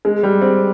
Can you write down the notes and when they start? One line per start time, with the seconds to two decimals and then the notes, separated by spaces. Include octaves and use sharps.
0.05 G#3
0.23 G3
0.41 C4